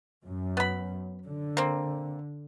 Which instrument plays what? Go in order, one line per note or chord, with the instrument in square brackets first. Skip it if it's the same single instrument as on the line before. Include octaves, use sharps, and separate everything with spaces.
[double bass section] F#2
[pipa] B3 B5
[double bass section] D3
[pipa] A#3 C4